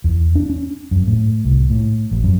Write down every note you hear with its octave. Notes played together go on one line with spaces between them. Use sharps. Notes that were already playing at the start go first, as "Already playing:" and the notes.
E2
D4
C#4
F#2
A2
C2
A2
A1
F#2